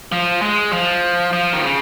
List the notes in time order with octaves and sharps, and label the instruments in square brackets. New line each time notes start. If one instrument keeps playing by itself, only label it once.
[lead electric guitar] F3
G#3
F3
F3
D#3
C#3